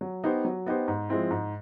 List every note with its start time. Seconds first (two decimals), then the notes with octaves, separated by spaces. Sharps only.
0.01 F#3
0.24 B3 D#4 G4 C5
0.45 F#3
0.66 B3 D#4 G4 C5
0.88 G#2
1.09 F3 G#3 C4 E4
1.31 G#2